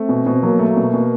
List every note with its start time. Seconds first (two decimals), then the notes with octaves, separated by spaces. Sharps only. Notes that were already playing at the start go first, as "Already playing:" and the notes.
Already playing: A3 C4
0.09 B2
0.26 B2
0.42 F#3 A#3
0.59 A3
0.77 B2
0.94 B2